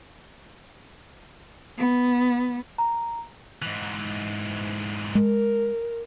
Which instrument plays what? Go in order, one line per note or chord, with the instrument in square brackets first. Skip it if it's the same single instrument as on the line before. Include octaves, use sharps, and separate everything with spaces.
[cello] B3
[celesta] A#5
[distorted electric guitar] G#2 E3
[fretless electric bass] G#3 [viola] A#4